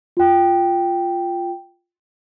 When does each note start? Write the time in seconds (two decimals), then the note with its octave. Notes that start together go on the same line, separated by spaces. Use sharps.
0.17 F4 G5